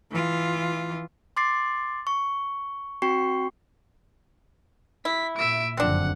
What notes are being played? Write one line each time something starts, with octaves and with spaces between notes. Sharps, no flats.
E3 F4
C6 D6 A6 C7
C#6
C4 F#4 G5 C#6 C7
E4 B6
A#2 E5 D7
F#1 F2 D3 C4 D4 F#5